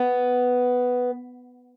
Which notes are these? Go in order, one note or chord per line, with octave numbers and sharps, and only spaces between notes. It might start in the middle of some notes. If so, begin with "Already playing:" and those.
Already playing: B3